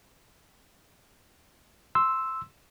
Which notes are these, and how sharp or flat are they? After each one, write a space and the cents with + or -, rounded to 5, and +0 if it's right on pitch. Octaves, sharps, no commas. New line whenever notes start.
C6 +0 E6 +0